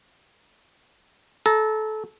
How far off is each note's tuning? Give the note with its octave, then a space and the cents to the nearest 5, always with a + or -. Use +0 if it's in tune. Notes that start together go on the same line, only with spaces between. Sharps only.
A4 -25 A#5 +0